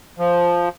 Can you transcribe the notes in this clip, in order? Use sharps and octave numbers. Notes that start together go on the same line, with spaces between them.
F3